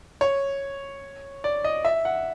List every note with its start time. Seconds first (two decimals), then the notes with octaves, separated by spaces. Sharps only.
0.21 C#5
1.44 D5
1.64 D#5
1.85 E5
2.05 F#5